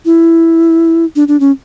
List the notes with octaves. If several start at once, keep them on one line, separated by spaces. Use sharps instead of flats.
E4
D4
D4
C#4